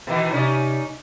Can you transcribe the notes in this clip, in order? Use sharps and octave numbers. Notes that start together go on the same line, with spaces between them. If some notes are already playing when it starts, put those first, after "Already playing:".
B2 D#3 E3
C3 C#4 D#4 D5